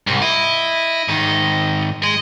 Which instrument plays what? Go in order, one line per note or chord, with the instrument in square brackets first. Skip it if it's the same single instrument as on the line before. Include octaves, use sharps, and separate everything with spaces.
[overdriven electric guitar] C2 [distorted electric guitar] G#2
[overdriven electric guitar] E4 [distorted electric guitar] D#5
[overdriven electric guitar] G#2 D#3
[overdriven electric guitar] G#3 [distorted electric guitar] D#5